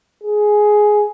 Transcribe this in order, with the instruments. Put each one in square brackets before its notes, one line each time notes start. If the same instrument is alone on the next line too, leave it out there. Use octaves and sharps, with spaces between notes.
[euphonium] G#4